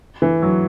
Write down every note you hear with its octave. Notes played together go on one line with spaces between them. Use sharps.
E3
F#3